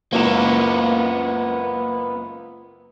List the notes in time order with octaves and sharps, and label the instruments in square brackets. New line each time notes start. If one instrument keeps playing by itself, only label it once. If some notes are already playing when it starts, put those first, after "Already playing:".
[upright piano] F#1 C#2 E7 [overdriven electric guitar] A#3 B3